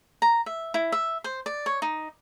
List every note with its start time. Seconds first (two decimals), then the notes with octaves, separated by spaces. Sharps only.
0.22 A#5
0.46 E5
0.74 E4
0.92 E5
1.24 C5
1.46 D5
1.66 C#5
1.82 D#4